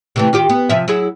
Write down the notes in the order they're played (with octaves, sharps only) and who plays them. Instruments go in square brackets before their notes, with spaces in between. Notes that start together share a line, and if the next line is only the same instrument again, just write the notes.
[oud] C3 E3 A3
D#3 F4 G4
B3
C3 F3 E5
F#3 E4 G#4